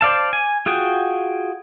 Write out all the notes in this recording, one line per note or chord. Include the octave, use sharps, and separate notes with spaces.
C5 D5 F5 A5
G#5
F4 F#4 G#4 G5